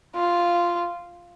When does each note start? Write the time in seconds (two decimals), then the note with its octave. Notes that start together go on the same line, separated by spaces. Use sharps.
0.16 F4